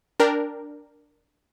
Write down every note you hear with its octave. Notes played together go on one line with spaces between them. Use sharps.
D4 A#4 G5